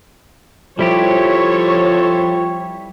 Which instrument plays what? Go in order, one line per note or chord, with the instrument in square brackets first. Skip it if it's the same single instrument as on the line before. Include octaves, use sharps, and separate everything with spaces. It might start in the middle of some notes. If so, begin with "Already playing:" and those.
[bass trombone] F3 [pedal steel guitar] G3 E4 G4 [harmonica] C4 A4 C5 [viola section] C#5